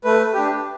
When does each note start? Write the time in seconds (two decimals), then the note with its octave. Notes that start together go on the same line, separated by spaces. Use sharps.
0.04 A3 B4
0.34 D4 G4